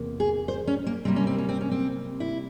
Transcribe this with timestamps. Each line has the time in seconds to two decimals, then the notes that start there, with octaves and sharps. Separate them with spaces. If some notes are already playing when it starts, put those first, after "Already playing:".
Already playing: E2 C3 A#3
0.20 G#4
0.48 C5
0.67 C#4
0.87 A#3
1.05 C3 G3 A#3 C4
1.16 C#4
1.27 C4
1.38 C#4
1.49 C4
1.61 C#4
1.71 C4
2.20 E4